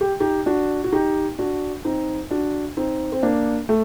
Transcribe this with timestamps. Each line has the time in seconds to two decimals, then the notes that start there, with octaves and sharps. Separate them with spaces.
0.01 G4
0.20 D#4 G4
0.46 D4 F#4
0.84 F#4
0.92 D#4 G4
1.39 D4 F#4
1.85 C4 D#4
2.31 D4 F#4
2.77 C4 D#4
3.12 C4
3.23 A#3 D4
3.69 A3